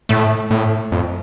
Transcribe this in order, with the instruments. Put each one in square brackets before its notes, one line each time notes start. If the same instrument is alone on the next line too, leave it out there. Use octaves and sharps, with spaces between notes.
[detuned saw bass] A2 [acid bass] A3
[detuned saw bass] A2
F2